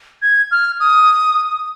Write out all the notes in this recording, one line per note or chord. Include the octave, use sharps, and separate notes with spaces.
G#6
F6
D#6